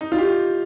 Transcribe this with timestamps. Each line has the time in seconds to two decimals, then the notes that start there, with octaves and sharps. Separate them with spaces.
0.01 D#4
0.12 F4
0.18 G4